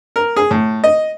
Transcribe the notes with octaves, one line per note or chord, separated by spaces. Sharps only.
A#4
G#4
A2
D#5